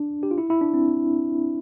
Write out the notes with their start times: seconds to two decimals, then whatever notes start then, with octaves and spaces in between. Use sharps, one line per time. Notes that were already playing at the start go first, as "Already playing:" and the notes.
Already playing: D4
0.23 G4
0.31 F4
0.38 E4
0.50 E4
0.61 D4
0.74 C4